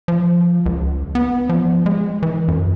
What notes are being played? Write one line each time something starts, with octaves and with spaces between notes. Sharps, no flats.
F3
C#2
B3
F3
G#3
E3
F#2